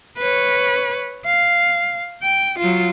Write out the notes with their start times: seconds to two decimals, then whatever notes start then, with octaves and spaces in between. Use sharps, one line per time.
0.18 B4 C#5
1.26 F5
2.23 G5
2.59 F#3 F4